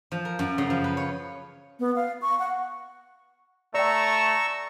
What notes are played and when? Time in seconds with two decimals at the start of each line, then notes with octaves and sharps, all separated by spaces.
0.12 F3
0.25 A#4
0.39 F#2
0.58 C#3
0.70 F3
0.84 B4
0.97 C#5
1.80 B3
1.96 F5
2.22 C#6
2.39 F#5
3.74 A3 D5 G5 A#5 C#6 E6